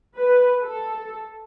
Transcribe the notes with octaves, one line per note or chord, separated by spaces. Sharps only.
B4
A4